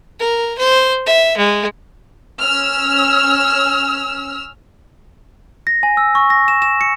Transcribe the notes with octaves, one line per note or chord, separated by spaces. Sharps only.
A#4
C5
E5
G#3
C#4 E6 F6
A#6
G#5
E6
C#6
A#6
E7
E7
C#7